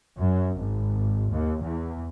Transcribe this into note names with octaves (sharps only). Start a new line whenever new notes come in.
F#2
G#1
D#2
E2